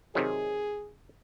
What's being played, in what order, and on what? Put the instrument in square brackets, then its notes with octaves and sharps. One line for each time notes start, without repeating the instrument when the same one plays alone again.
[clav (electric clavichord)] C3 D#3 F#3 [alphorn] G#4